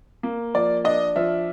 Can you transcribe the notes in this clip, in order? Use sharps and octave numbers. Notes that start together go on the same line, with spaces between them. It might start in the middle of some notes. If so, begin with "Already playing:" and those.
A#3
F3 D5
D4 D#5
F3 E5